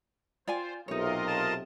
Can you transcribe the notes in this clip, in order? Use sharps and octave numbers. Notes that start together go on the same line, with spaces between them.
F4 C5 D5 G#5
B1 C3 D#4 F4 A#4 C#5 D#5
A5